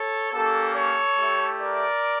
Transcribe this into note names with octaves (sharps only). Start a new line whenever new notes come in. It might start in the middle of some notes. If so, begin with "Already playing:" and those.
Already playing: A4 C#5
A#3 C#4 G4 A4
A4 C#5
A3 E4 G4
A#4 D5